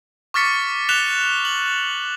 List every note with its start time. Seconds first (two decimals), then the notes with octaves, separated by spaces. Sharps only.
0.34 C#6 D6 F6 A6 B6 C#7
0.89 F#6 B6 E7 F7 G7
1.45 F#7